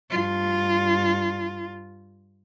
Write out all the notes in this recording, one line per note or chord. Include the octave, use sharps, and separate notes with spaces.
G2 F4